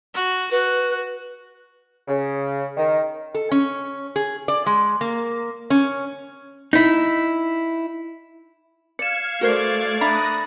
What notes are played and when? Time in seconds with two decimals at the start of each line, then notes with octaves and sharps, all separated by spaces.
0.14 F#4
0.51 F#4 B4
2.08 C#3
2.77 D#3
3.34 A4
3.51 C#4
4.16 G#4
4.48 D5
4.66 G#3
5.01 A#3
5.70 C#4
6.73 D#4 E4
8.99 D5 F5 G#6 C#7 E7
9.41 A3 F#4 A#4 C5 D5
10.01 D4 E5 A#5 B5 D#6 F#6 A6 A#6